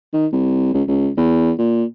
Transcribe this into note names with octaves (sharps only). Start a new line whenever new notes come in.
D#3
C2
C#2
C#2
E2
A#2